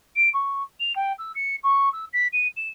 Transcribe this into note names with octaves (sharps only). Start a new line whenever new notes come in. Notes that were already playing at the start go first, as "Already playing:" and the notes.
D7
C#6
F7
G5
E6
C#7
C#6
E6
B6
D#7
E7